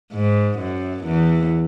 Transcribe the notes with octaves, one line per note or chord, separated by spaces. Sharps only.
G#2
F#2
E2